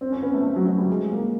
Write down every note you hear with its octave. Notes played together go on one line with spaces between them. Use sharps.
C4
C#4
B3
A3
A3
F#3
F#3
G3
G#3
A#3